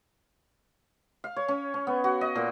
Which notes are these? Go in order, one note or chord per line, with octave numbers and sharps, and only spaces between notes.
F5
C#5
C#4
C#4
B3
F#4
D#5
A#2